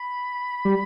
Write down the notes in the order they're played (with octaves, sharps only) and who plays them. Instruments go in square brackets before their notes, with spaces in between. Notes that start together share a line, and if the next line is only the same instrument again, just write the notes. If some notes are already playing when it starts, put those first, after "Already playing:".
Already playing: [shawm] B5
[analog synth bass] G3